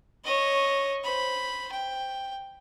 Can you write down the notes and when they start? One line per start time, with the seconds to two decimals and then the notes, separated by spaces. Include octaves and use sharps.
0.24 C#5 D#5
1.04 C5 B5
1.72 G5